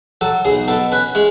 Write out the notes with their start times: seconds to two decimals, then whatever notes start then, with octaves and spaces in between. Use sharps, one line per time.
0.21 F#3 A4
0.45 B1 G#4
0.68 B2 A4
0.92 C#4 B4
1.15 G#3 C#5